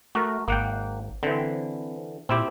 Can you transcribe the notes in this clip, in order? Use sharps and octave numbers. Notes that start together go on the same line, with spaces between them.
A3 F#4 A#4
G#1 A#3 F#5 G5
D3 E3 C4
A#2 C4 E4 G4